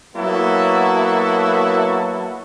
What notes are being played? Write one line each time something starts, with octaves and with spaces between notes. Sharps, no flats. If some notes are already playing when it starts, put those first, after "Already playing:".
F#3 A#3 B3 E4 F#4 A4